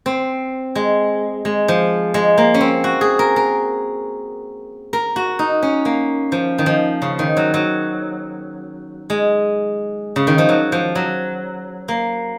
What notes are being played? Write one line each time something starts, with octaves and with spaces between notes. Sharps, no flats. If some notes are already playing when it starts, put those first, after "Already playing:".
C4
G#3
G#3
F3
G#3
A#3
C#4
C4
F#4
G#4
A#4
A#4
A#4
F#4
D#4
C#4
A#3
F3
D#3
F3
C#3
D#3
F#3
F#3
G#3
C#3
D#3
F3
F#3
F3
F#3
A#3